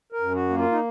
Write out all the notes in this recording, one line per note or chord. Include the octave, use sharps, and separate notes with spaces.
A#4
F#2
F#4
A#3
F4
D#4